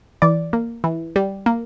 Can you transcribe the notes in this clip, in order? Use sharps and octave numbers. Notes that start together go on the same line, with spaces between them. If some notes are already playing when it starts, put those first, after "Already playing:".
E3 D5
A#3
E3
G3
A#3